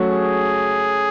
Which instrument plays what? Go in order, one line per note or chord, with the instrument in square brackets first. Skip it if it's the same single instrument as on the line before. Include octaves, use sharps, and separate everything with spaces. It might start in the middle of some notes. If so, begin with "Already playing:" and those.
Already playing: [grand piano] F#3 A3 C#4 F#4
[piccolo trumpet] G#4